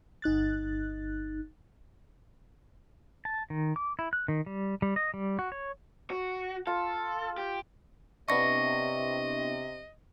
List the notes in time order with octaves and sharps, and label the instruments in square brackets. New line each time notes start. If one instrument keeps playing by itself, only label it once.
[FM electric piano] G1 D#4 F#6 A6
[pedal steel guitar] A5
D#3
D6
E4
F#6
D#3
G3
G3
D#5
G3
F#4
C#5
[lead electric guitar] F#4
[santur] F4 [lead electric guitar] A4
[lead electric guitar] G4
[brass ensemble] C3 [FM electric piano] B3 D4 E4 [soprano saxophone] D#5 [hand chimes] C#6 A#6